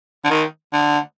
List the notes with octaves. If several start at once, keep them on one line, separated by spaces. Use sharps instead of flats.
D3
D#3
D3